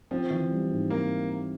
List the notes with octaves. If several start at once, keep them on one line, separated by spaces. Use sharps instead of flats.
F3 C4
E3
G3
G#2
A#3 C4